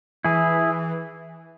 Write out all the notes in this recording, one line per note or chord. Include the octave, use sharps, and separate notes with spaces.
E3 E4 G#4